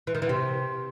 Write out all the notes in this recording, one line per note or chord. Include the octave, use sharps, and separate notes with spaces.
E3
D#3
E3
C3